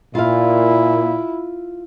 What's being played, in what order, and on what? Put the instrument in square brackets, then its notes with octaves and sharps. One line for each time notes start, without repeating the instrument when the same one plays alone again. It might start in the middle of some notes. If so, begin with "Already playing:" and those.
[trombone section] A#2 [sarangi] E4 [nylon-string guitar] F4 F5